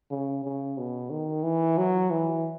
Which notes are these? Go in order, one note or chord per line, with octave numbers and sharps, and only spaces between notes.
C#3
C#3
B2
D#3
E3
F#3
E3